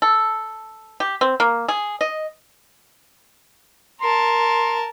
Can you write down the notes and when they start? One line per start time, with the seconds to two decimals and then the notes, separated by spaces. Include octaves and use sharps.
0.02 A4
1.00 G4
1.21 C4
1.40 A#3
1.68 G#4
2.01 D#5
4.01 A#4 A5 C6